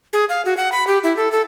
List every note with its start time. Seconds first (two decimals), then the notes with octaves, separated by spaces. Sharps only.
0.13 G#4
0.29 F5
0.45 F#4
0.57 F#5
0.72 B5
0.87 G4
1.03 E4
1.17 A4
1.32 A4